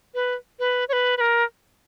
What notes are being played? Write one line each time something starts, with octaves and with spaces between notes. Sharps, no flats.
B4
B4
C#5
B4
B4
A#4